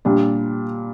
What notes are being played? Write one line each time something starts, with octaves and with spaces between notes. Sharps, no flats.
A#2 G3 D4